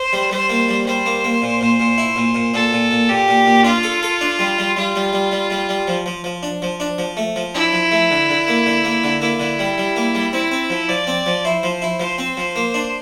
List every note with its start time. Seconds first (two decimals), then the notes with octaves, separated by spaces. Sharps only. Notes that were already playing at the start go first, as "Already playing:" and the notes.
Already playing: C5
0.13 G3
0.30 G3 C5
0.49 A#3
0.68 G3
0.86 G3 C5
1.06 A#3
1.24 A#3
1.42 A#2
1.61 A#2
1.80 A#2
1.98 E4
2.16 A#2
2.35 A#2
2.54 A#2 A4
2.73 A#2
2.91 A#2
3.09 A#2 G4
3.28 A#2
3.46 A#2
3.64 D4 F4
3.83 A4
4.03 A4
4.21 D4
4.39 G3
4.58 G3
4.77 G3 F4
4.95 G3
5.13 G3
5.31 G3
5.50 G3
5.69 G3
5.88 F3
6.06 F3
6.24 F3
6.43 D4
6.62 F3
6.80 D4
6.98 F3
7.17 A3
7.36 F3
7.54 D4 E4
7.73 F3
7.91 A3
8.11 D3
8.29 D3
8.48 A#3
8.66 D3
8.85 A#3
9.04 D3
9.21 A#3 E4
9.40 D3
9.59 G3
9.78 G3
9.96 A#3
10.15 G3
10.33 C4 E4
10.51 C4
10.70 F3
10.89 F3 D5
11.07 C4
11.26 F3
11.45 E4 C5
11.63 F3
11.82 E4
12.00 F3 C5
12.18 C4
12.37 F3
12.56 A#3
12.74 D4